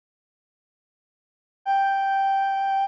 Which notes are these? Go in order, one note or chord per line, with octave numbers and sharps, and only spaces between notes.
G5